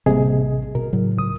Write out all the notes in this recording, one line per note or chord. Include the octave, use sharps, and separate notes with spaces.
A1 C3 G3 A#3 G#4 D#5
B2 A#4
A2 C#3 F#3
C#2 D#6